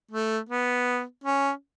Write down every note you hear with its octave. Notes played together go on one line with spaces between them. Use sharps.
A3
B3
C#4